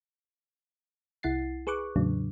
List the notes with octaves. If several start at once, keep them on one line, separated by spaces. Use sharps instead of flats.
C2 E4 F#5 A6 C7
G#4 B4 C#6 D6 F#6
E2 A2 C#3 F#3 D4